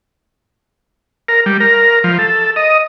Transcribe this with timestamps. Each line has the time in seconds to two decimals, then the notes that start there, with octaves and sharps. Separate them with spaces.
1.28 A#4
1.46 G3
1.60 A#4
2.04 F3
2.19 A4
2.56 D#5